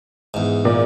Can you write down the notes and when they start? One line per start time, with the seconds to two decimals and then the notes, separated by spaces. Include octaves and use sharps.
0.34 E2 G#2
0.65 A#2